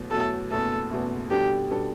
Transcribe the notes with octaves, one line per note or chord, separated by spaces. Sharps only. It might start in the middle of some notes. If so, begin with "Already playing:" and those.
Already playing: E2 B2 F#3 A3
E2 B2 F#3 A3 A4
F#1 E2 B2 A3 A4
F#1 E2 B2 A3
B2 G3 D4 G4 A4
B2 G3 D4 A4